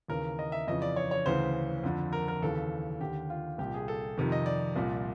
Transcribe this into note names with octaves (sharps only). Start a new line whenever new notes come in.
D#2 C#3 E3 A#4
D#5
E5
F2 C#3 E3 D#5
D5
C#5
C#5
D2 C#3 E3 C5
F2 D3
A#4
A#4
D#2 C#3 E3 A4
D#2 D3 G4
F4
C2 A#2 G4
G#4
A4
F2 C3 D#3
D#5
D5
C2 A#2